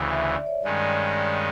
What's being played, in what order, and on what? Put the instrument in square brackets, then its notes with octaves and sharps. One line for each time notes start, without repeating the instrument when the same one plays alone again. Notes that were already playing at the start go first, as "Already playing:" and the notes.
Already playing: [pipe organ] D2 C#3 E3 [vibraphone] E5
[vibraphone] E5
D5
C#5
[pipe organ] G2 D#3 G#3 C#4 [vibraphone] D5
[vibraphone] D#5